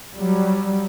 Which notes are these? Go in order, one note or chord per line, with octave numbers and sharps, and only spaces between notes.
F#3 G3